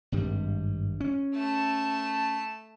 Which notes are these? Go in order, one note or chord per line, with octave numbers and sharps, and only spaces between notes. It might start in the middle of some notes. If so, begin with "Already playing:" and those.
G#1 G2 G3
C#4
A3 A5